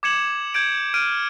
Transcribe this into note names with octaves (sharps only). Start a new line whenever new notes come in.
D6 G#6 C#7 E7 F#7
G6 G#6 D7
F6 D7 D#7